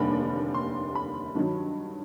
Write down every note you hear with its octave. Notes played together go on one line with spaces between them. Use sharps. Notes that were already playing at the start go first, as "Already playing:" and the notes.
Already playing: F1 D#2 D3 G3 B5
C6
B5
G2 D#3 F#3